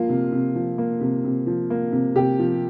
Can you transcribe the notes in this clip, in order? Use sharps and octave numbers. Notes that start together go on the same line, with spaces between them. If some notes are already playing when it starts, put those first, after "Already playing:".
Already playing: F3 A#3 F4
C3
C3
F3
A#3
C3
C3
F3
A#3
C3
C3 G4
F3